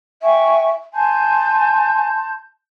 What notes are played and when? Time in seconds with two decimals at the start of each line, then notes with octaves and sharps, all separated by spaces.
0.22 E5 G5 G#5 C#6
0.94 G#5 A5 C6 G6